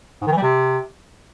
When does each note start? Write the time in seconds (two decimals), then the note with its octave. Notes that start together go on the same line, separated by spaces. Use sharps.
0.21 G#2
0.26 D#3
0.32 E3
0.37 G3
0.42 C3